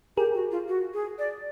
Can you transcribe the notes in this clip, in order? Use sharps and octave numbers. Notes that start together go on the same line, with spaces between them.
G4 G#4 A#4
F#4
F4
F#4
G#4
D5